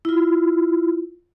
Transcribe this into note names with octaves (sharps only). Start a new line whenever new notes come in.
E4 F4